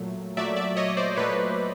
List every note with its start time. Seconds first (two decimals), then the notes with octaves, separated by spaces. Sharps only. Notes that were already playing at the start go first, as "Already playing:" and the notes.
Already playing: A#2 F#3 A3
0.36 A#2 F#3 A3 D5 E5
0.56 D5 E5
0.77 C#5 D#5
0.97 C5 D5
1.16 A#2 F#3 A3 B4 C#5